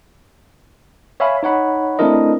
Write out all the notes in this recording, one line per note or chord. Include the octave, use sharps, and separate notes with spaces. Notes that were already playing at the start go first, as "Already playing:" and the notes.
C#5 E5 F5 G#5 B5
D#4 C#5 F#5 B5
A3 C4 D4 E4 A#4 D#5